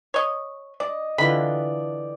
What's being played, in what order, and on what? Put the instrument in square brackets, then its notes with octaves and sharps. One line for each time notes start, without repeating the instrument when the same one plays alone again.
[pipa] C#5 D#5
[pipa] D5 [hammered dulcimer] D#5
[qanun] D3 E3 F4 [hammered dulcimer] D5 G5 [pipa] B5